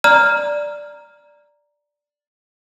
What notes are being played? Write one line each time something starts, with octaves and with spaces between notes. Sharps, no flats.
D5 A#5 F6